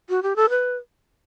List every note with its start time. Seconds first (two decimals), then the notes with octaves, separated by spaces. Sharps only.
0.09 F#4
0.23 G4
0.36 A4
0.50 B4